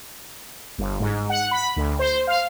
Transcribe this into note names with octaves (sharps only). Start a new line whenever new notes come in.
G1
G#2
F#5
B5
D2
C5
F5